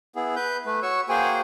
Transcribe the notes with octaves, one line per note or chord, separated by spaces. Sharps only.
B3 E4 G#4
B4 G6
A3 B4
F#4 C#5 C#6 E6
A#3 F#4 G#4 C5 G5 G#5